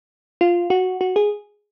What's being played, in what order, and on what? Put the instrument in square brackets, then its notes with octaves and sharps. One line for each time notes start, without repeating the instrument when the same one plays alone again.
[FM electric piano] F4
F#4
F#4
G#4